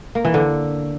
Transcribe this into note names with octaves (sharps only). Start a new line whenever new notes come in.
A#3
E3
D3